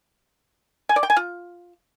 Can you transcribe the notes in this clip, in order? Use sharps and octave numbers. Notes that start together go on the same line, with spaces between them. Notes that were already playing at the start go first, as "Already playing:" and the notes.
G#5
D5
G5
G#5
F4